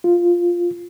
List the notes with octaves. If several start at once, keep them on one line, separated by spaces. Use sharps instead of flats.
F4